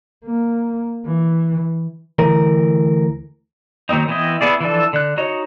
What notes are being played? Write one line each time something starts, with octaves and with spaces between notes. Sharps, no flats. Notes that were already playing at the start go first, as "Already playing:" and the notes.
A#3
E3
D2 E3 A#4
D#3 F#3 A#3 C4 D#4
E3 B3 C4 E4 D#5
B3 E4 G#4 D5
E3 F3 D4 A4
D3 F#6
D#4 F#4 C#5 D#5